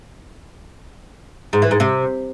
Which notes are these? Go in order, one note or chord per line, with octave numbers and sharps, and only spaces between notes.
G#2
E3
G#2
C3